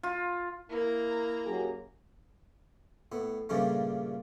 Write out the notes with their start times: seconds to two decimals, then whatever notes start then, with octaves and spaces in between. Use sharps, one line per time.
0.03 F4
0.70 A#3 E4 A#4 A#5
1.46 F#2 G4 G#4
3.12 A2 B3
3.49 G2 A#2 C#3 F3 G3 A3